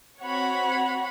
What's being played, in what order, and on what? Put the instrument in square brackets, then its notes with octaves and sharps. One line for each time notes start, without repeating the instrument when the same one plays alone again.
[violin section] C4 F#4 C#5 [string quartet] F#5 B5